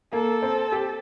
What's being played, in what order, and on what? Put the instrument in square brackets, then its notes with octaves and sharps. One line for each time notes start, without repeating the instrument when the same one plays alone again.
[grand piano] A#3 [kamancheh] A4
[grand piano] C4
G4